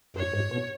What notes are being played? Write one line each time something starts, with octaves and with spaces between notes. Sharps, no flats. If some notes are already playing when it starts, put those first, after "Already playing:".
F#2 C#5
G#2
B2